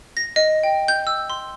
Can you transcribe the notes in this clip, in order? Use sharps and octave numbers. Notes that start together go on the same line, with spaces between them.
A#6
D#5
G5
G6
E6
C6